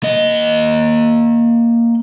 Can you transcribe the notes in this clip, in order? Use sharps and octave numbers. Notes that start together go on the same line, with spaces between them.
A#3 D#5